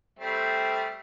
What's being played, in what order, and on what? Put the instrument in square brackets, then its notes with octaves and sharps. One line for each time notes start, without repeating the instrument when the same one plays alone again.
[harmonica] G3 A3 C4